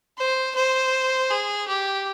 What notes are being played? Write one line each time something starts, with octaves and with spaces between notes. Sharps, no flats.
C5
C5
G#4
G4